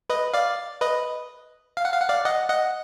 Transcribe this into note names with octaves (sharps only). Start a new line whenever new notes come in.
B4 D#5
D5 F5
B4 D#5
F5
F#5
F5
F#5
D5 F5
D#5 F#5
D#5 F#5